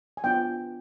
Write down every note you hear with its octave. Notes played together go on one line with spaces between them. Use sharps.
G#5
B3 D4 F4 G5